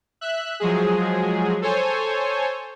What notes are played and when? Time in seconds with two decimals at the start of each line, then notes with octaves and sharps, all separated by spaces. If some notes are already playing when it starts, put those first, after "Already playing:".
0.21 E5 F#6
0.60 F3 F#3 G#3 G#4
1.62 A4 C5 C#5 G#5